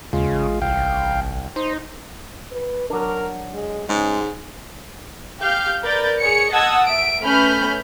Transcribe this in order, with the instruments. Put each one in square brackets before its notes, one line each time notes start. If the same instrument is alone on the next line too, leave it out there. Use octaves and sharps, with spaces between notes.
[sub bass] D#2 [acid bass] C#3 [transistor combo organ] G#3 F4
[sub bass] A1
[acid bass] C2 [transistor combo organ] F5 G5
[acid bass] D#4 [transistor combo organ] C5
[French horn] B4
[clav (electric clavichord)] F#3 D4 [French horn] A#4
[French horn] G#3
[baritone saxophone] G#2 [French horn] C#3 [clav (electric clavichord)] G#3
[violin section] G4 F5 G6
A#4 B4 D5 B5 G6 A6
G#4 C#5 C#7
D#5 F#5 A5 D#6 E6 G#6
E5 D7
A3 C#4 B4 B5 F6 G6